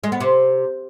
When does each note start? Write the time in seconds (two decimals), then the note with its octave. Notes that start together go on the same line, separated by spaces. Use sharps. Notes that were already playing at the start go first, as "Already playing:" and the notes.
0.04 G#3
0.12 B3
0.20 C3